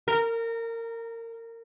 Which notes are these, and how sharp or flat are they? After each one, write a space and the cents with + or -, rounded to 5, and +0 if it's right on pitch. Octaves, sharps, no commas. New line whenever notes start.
A#4 -25